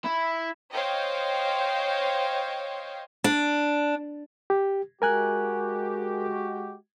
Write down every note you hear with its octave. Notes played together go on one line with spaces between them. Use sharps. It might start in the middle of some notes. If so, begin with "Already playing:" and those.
E4
C5 C#5 D#5 F5 G5
D4
G4
G#3 F#4 G4 A#4 G#5 F#6